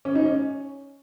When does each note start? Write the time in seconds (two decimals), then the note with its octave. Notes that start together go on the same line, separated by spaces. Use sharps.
0.05 C#4
0.15 D#4
0.25 C#4